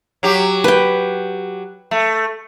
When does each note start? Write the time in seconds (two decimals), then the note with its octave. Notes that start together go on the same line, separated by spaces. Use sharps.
0.23 F#3 G4
0.64 B4 G5
1.91 A3